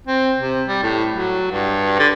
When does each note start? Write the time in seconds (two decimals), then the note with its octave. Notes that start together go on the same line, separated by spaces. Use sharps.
0.07 C4
0.38 C3
0.68 G3
0.83 A2
1.11 F#3
1.51 G2
1.99 D3